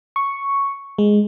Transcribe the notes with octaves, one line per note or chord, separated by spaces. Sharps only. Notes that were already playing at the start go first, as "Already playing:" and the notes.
C#6
G#3